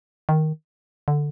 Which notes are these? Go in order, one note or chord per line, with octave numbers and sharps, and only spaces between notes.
D#3
D3